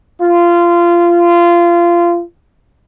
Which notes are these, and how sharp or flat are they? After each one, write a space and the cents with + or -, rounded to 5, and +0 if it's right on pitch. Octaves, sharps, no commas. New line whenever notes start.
F4 -20